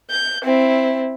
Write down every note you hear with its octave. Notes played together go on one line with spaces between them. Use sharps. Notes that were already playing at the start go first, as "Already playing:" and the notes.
G6
C4 E4